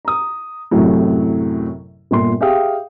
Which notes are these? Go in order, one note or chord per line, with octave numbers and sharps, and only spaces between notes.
A#5 D#6
A1 F#2 A2 C3 F#3
G1 A#2 C6
G4 G#4 E5 F5 G5 D#6